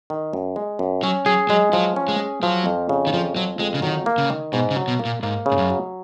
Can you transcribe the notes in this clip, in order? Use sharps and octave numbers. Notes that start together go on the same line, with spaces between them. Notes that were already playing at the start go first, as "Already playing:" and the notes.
D#3
F#2
G#3
F#2
F#3 C#4
F#3 G#4
F#3 G#3
F3 F#3
C#4
G#3
G#4
F3 F#3
F2
C#3
D#3
F2 F3
F3 F#3
F2 G#3
C#3
D#3 F#3
A#3
C#3
D#3
G#2 B2
C#3
F#3
B2
A#3
A#2
G#2 A#3
C#3
G#2
F#2
F#3